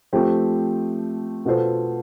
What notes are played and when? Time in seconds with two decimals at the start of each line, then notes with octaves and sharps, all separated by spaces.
0.13 F3 A3 C4 G4
1.45 B2 B3 F4 A4 C5